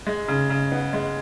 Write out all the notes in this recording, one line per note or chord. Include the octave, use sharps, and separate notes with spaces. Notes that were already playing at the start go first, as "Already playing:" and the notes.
G#3
C#3
C#3
B3
G#3